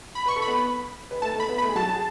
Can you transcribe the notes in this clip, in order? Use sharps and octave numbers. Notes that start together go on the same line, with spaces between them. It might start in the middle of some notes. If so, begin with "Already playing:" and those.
B5
B4 C#6
A4
B5
B3 B4
B4
A3 A4 A5
A3 A4
B5
B3 B4
B5
A3 A4
G#4
F#3 F#4 A5
G#4